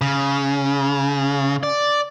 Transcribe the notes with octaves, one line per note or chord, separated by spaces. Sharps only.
C#3
D5